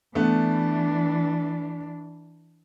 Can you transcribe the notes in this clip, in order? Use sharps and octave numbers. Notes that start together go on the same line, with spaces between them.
E3 A3 B3 D4